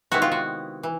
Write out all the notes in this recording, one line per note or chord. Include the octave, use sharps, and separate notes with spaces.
C3 D#3 G#3 B3 E4 F#4
F4
F#4
E3